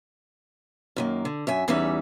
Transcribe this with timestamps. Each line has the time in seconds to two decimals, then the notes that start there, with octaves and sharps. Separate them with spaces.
0.96 F#2 D#3 A#3
1.25 D3
1.47 F#2 E5 G#5
1.68 E2 E3 G3 C#4 D#4 E5